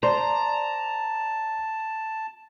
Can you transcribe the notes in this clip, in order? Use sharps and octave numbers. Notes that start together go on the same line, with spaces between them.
C5 D5 A5 A#5